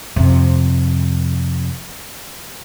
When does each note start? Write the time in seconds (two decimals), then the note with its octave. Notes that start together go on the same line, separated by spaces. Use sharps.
0.16 F2 C3